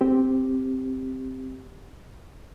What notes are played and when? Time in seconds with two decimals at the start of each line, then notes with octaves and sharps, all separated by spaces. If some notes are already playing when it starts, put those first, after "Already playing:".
0.01 C4 G4